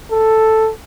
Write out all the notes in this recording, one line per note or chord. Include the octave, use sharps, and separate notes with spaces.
A4